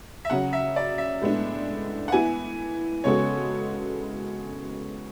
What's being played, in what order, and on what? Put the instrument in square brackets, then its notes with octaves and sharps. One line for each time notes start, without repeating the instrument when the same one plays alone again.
[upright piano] E5
[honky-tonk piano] C#3 F#3 C#4 [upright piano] F#5
[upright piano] E5
D5
E5
[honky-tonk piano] A2 G#3 B3 D4
[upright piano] F#5
[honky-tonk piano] E3 B3 E4 [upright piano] G#5
[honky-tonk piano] C#3 G#3 B3 F#4 A4 [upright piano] C#5